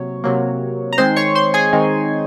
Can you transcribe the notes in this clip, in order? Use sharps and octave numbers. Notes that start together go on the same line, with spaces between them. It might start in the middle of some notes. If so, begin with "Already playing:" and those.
Already playing: C3 F#3 A#3 C#5
C3 F#3 A#3
A#5
D#3 G#3 C4 D#4 C5 C6
C#5 C#6
C5 C6
G#4 G#5
D#3 G#3 C4 D#4